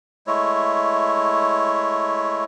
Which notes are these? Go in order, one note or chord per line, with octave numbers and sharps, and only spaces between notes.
G#3 A3 E4 C#5